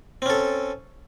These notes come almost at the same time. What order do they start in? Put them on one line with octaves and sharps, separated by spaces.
C4 C#4 A4